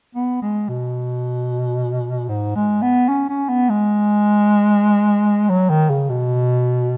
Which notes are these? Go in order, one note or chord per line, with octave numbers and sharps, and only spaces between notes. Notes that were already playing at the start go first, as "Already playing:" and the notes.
B3
G#3
B2
G#2
G#3
B3
C#4
C#4
B3
G#3
F#3
D#3
C#3
B2